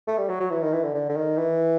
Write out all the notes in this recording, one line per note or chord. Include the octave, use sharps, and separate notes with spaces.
A3
G3
F#3
F#3
E3
D#3
E3
D3
D3
D3
D#3
E3